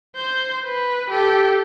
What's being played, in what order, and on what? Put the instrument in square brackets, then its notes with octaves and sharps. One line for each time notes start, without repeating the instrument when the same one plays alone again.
[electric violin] C5 G6
B4
G4 A4